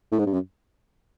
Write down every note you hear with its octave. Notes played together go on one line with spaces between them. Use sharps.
A2
G#2
G2
F#2